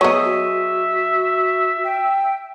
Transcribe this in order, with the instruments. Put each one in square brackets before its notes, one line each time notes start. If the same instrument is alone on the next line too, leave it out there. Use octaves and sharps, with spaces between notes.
[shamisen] F#3 B3 [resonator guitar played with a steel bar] G#4 C5 D#5 [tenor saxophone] E5
[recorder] F#4
G5